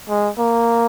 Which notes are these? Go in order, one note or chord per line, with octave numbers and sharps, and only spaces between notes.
G#3
A#3